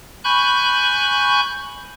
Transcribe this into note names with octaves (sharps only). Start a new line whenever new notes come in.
G#5 B5 C#6 F#6 G6